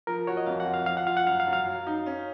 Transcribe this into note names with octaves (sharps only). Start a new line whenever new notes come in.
F3 A#4
F#4 C#5
D#5
F2 F5
F#5
F4
F5
F3 F5
F#5
F4 F5
F#5
F#2 F5
F5
F#2
F5
F#3
D#4
C#4